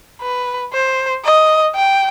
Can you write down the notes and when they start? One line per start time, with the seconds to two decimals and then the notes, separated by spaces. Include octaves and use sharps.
0.21 B4
0.73 C5
1.25 D#5
1.75 G5